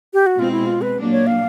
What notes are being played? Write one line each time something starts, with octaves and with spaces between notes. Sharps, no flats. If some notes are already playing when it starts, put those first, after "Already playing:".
G4
F#4
B2 G#3 C4 F4
E4
F4
B4
A#2 F#3 A#3 D4
C#5
F5